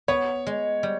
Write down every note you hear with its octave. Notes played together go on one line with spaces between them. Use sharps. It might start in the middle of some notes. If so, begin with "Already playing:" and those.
B3 C#5
G#3
G3